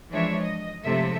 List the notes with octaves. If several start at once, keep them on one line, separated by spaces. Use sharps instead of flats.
E3 F3 G#3 D4 C#5 E5
D#5
A2 C3 F3 G#3 A4 E5